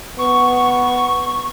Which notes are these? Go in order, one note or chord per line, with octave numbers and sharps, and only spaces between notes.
B3 C#6